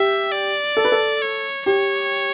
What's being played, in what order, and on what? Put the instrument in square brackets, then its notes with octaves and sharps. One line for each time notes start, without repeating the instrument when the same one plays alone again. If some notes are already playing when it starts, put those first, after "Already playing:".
Already playing: [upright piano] G4 [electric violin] E5
[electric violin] D5
[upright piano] A4
B4
A4
[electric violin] C#5
[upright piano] G4 [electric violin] C#5